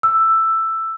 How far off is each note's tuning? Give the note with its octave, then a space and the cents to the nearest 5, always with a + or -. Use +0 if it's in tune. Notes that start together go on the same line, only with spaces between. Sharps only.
E6 +10